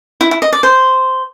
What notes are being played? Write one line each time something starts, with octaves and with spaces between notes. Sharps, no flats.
E4
E4
D#5
D5
C5